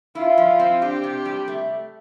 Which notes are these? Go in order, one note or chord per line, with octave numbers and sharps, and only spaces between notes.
E4 F4
F3
C4
D4 G4
C3
G3
A3